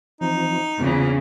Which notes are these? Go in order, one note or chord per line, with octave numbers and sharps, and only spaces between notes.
E3 F3 C4 D#4
E2 C#3 E3 C4 D4 F4